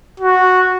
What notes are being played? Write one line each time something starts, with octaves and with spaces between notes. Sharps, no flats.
F#4